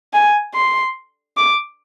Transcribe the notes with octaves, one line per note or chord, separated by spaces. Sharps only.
G#5
C6
D6